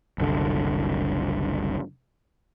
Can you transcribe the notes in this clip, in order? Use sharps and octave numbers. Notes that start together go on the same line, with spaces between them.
F#1 C2 D3